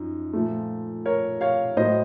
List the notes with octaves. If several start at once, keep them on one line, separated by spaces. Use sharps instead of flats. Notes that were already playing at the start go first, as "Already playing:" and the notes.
Already playing: F#2 F3 D#4
A#2 F3 A3
A#4 C#5
C#5 F5
A2 F#3 A#3 C5 D#5